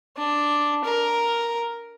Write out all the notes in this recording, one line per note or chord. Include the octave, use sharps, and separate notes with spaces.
D4
A#4